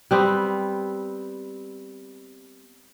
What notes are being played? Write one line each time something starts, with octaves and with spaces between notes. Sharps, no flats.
G3 B3 C4